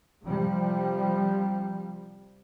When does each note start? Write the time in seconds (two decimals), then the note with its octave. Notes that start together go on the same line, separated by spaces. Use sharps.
0.23 C3 F3 G3